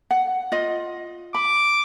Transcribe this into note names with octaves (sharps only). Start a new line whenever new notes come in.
F#5
F4 D#5
B5 D6